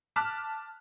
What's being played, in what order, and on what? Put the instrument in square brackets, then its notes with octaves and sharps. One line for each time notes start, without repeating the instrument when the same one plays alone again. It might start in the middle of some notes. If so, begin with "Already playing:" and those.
[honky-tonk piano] A5 D6 F6 F#6 B6